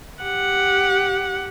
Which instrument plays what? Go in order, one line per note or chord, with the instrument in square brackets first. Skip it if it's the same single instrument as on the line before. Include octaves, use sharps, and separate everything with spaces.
[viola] G4 F#5